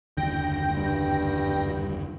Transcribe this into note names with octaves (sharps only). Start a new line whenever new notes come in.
F#1 D#2 D3 G5 A#6
G2